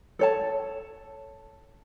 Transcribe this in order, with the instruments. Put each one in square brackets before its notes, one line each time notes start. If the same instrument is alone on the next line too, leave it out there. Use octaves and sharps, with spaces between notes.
[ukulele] A4 C#5 A5